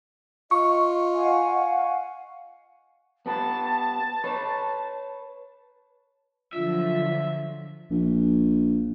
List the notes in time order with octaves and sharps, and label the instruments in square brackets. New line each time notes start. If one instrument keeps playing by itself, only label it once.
[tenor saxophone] F4 [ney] D#5 [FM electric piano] C#6
[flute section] F5 F#5 G#5
[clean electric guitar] B3 G4 B4 [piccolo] A5
[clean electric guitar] B4 C#5
[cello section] D3 F3 F#3 [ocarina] F4 [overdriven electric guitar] E5
[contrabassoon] A#1